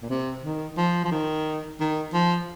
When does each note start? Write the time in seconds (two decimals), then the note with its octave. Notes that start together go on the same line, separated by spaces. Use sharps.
0.03 A#2
0.10 C3
0.44 D#3
0.77 F3
1.04 F3
1.12 D#3
1.80 D#3
2.14 F3